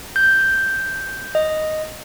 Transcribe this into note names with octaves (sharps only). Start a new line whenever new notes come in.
G6
D#5